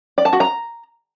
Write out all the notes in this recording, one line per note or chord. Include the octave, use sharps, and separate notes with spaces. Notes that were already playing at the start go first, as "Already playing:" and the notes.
D5
A5
F#4
A#5